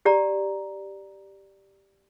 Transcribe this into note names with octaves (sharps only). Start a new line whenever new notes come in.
G4 D5 A#5